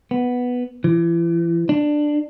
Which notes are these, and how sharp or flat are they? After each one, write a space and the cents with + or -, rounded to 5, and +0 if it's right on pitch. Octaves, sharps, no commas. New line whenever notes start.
B3 +0
E3 +35
D4 +10